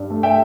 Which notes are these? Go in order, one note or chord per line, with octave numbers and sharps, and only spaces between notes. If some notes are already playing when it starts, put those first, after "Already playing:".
Already playing: G2
A3
E5 G5